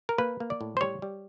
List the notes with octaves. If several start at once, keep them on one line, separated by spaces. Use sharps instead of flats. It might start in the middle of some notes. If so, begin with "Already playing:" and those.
A#4
A#3 B4
A#3
D5
A2
C5
G3 C#5
G3